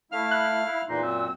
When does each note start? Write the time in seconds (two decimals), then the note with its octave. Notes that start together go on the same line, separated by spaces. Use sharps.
0.12 A3 E4 F5 F6
0.31 F#6
0.64 E4
0.88 E2 A#2 D#4 C6
1.02 F#2 C4 E6